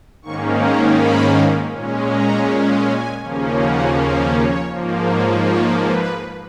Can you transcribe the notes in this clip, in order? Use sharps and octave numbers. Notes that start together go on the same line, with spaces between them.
G#2 D#3 A#3 C#4 C#6
A#5
B5
A#2 G#3 C#4
A#5
G#5
D#2 C#3 F3 A#3 C#4
F#5
C#5
G#2 F3 A#3
C#5
C#5
B4